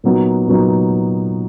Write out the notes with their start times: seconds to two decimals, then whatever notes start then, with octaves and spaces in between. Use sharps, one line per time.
0.04 A#2 F#3 B3 D#4
0.47 A#2 F#3 B3 D#4